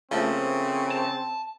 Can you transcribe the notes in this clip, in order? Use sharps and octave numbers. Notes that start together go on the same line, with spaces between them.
C#3 F3 A3 A#3 C4
A5